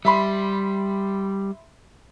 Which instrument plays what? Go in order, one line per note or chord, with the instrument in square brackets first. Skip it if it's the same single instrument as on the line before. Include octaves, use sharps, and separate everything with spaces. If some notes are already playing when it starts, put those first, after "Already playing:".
[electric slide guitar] G3 [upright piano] E5 B5 C6